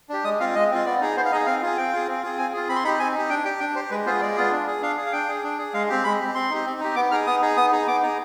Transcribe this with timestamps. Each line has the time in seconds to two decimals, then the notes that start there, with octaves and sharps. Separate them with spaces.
0.09 D4 G4
0.24 G#3 D#6
0.40 C4 F4 F5
0.55 G#3 D#5
0.71 C4 F4
0.85 B3 D5
1.01 D#4 G#4
1.16 B3 C5
1.25 F5
1.31 D#4 G#4 D#5
1.46 C4 F5
1.62 F4 G#4
1.77 C4 G5
1.92 F4 G#4
2.08 C4
2.23 F4 G#4
2.38 C4 G#5
2.53 F4 G#4
2.68 C4 B5
2.76 C6
2.84 D#4 G4 B5
2.99 C4 G#5
3.14 D#4 G4
3.29 D4 G5
3.45 G4 G5
3.60 D4 G5
3.75 G4 C5
3.91 G#3 B4
4.06 B3 F4 G#4 C5
4.21 G#3 D5
4.36 B3 F4 G#4
4.52 D4
4.67 G#4
4.82 D4 F5
4.97 G#4
5.06 F5
5.12 D4 G5
5.28 G#4
5.43 D4
5.58 G#4
5.74 G#3 F5
5.89 C4 G4
6.04 G#3 B5
6.20 C4 G4
6.35 C4 C6
6.50 D#4 G4
6.65 C4
6.80 D#4 G4
6.96 B3 D6
7.11 D#4 G#4 F6
7.26 B3 D#6
7.42 D#4 G#4
7.57 B3 D#6
7.72 D#4 G#4
7.87 B3 D6
8.03 D#4 G#4